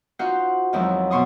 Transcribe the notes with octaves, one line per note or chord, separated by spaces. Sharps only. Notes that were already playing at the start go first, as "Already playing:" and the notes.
D#4 F4 F#4 C5 F#5
F2 D#3 F3 F#3 G#3 E4
B2 C6 C#6 D#6